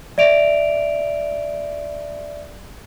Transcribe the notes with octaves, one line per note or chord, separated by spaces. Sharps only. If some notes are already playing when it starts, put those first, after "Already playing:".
D5 E5 D7 F7